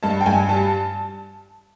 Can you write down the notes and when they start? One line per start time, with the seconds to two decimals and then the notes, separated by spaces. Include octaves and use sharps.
0.03 G2 A5
0.21 G5
0.26 G2 G#5
0.49 G3 A5